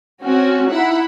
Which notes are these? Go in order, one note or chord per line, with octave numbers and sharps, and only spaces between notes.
C4 C#4 F#4
D#4 E4 F#5 B5